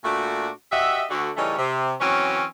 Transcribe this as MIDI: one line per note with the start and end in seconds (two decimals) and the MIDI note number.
0.04 0.49 46
0.04 0.49 57
0.04 0.49 62
0.04 0.49 66
0.72 1.04 66
0.72 1.04 67
0.72 1.04 75
0.72 1.04 76
1.10 1.30 38
1.10 1.30 50
1.10 1.30 66
1.37 1.55 49
1.37 1.55 52
1.37 1.55 55
1.37 1.55 57
1.37 1.55 61
1.37 1.55 63
1.58 1.93 48
2.00 2.44 52
2.00 2.44 54
2.00 2.44 60
2.00 2.44 61